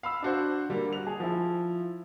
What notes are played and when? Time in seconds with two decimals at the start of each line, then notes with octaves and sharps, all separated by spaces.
0.03 F5 B5 E6
0.22 D4 F#4 C5
0.69 D3 G3 A#3
0.93 F#4 F7
1.07 G#4
1.20 F3 E4